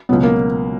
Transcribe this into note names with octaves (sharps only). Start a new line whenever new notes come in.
C#2 B2 F#3 B3
A#3